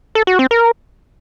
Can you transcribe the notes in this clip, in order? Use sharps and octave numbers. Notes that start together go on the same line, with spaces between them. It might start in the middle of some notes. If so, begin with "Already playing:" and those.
A4
F#4
C4
A#4